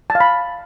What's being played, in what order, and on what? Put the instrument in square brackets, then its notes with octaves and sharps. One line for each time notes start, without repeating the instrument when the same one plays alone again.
[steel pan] A5
F5
B5